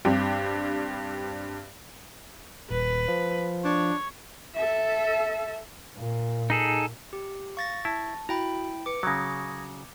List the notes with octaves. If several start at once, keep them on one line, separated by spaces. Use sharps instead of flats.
G2 G3 C4 D4
D#1 B4
F3
D4 C#5
A4 E5
A#2
D#4 G#4 A4
G4
F5 C#6 A6 A#6
E4 A5
E4 F#4 G5 A#5 B5
B4 D6 C#7
C#3 F#3 D#6 G#6 A#6